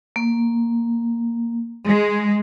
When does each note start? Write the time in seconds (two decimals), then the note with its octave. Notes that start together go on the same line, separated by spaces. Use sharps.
0.16 A#3
1.86 G#3